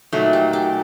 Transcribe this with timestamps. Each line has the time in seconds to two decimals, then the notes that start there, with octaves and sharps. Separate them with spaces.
0.12 A#2 F#3 A3 D#4
0.33 G4
0.53 G4